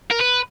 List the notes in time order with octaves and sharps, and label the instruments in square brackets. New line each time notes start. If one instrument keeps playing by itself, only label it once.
[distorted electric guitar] A#4
B4